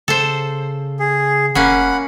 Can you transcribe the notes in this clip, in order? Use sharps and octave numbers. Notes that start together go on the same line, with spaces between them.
C#3 A4 C5
G#4
F1 A#3 C#4 F#5 B5